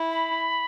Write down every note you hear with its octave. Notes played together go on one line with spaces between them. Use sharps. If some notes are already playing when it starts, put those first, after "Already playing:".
Already playing: E4
B5